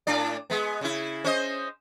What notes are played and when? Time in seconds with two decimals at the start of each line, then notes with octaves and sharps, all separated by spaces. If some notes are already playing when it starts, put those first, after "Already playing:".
0.07 A2 D4 D5
0.50 G#3 B3
0.81 C#3 E4
1.24 C#4 C5 D#5